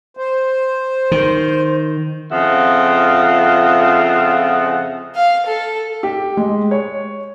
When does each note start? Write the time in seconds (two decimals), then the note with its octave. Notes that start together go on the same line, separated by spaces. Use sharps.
0.17 C5
1.12 D#3
2.32 F2 C#3 F4 D#5 E5 F#5
5.15 F5
5.46 A4
6.03 G4
6.37 G#3
6.71 C#5